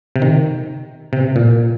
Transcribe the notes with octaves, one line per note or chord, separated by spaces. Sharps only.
C3
D#3
C3
A#2